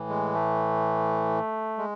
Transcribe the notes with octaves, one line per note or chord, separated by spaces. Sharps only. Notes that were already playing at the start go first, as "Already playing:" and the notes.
Already playing: A2 E3
G#3
A3
G#3